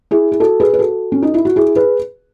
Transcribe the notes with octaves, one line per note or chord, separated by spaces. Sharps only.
E4 G#4
G#4
F#4 A4
G#4 B4
B4
F#4 A4
C#4
D#4
E4
F#4
E4 G#4
G#4 B4